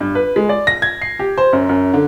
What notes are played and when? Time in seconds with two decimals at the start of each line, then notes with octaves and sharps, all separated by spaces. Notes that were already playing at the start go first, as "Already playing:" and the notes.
0.01 G2
0.15 B4
0.36 G#3
0.49 D5
0.67 A#6
0.82 G#6
1.02 C7
1.19 G4
1.38 C5
1.53 F#2
1.69 F#2
1.93 D3